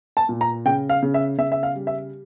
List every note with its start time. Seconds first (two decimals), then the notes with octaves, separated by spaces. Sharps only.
0.17 A5
0.29 A#2
0.41 A#5
0.66 C#3 G5
0.90 F5
1.03 C#3
1.14 E5
1.38 C#3 E5
1.52 E5
1.63 F5
1.75 G3
1.87 E5